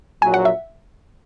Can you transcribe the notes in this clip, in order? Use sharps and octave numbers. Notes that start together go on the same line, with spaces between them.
A#1 A#2 F#3 G#5
F#5
E5